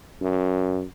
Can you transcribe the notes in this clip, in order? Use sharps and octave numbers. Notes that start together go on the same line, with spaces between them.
F#2